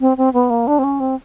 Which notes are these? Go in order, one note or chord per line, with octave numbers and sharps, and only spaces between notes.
C4
C4
B3
A#3
D4
C4
C#4
C4